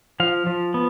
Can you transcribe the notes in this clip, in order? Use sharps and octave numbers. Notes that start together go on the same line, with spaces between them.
F3 F5
F3
B3